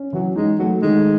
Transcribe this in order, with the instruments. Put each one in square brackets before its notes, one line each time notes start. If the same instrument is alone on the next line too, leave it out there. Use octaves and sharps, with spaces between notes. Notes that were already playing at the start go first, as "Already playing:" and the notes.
Already playing: [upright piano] C#4
[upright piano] E3 [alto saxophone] F#3
[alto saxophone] G#3 [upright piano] D#4
[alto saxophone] F#3 [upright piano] A3
[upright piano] D#3 [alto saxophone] G#3